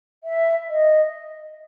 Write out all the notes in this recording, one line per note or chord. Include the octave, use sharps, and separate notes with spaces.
E5
D#5